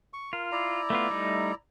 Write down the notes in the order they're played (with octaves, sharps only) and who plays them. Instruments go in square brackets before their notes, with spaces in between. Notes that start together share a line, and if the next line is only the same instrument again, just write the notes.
[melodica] C#6
[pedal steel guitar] F4 [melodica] A#4
[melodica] E4 D5 A#5
[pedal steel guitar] A3 B3 F4
G3 A3 D#4